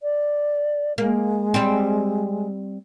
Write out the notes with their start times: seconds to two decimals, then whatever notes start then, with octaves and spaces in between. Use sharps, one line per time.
0.02 D5
0.98 G#3 A#3
1.54 G3 C4